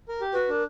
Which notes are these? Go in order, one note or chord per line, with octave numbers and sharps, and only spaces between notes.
A#4
G4
F#4 B4
D4 A#4